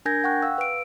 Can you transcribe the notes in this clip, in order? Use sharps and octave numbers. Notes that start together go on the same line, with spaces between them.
D4 A#4 G#5 G6 G#6 A#6
F#5 G5 C#6 F#6
F5 E6
B4 D7